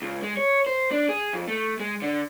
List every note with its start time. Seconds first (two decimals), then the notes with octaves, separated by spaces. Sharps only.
0.02 C#2
0.23 G#3
0.37 C#5
0.67 C5
0.91 D4
1.09 G#4
1.33 F2
1.48 A3
1.80 G#3
2.02 D3